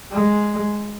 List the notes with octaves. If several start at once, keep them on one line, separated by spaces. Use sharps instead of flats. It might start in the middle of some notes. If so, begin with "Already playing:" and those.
G#3